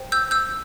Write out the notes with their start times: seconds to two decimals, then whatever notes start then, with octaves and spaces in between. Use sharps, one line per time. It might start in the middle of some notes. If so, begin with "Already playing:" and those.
Already playing: C5 G5
0.12 E6 G6
0.31 E6 G6